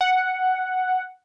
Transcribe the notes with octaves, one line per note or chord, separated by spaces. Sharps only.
F#5